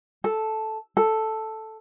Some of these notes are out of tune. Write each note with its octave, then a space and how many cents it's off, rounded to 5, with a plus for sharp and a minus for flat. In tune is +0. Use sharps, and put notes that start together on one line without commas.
A4 -5
A4 +0